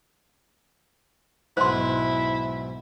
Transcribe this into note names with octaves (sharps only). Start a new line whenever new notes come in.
B1 G#2 E4 C5 C6